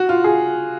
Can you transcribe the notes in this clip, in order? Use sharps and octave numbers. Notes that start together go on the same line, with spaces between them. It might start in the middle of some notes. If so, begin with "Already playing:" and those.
Already playing: F#4
F4
G#4